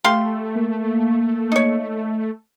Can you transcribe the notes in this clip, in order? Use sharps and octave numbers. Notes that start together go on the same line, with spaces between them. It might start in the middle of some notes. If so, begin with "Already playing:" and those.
A3 G4 F5 C6
A#3
D#4 C#5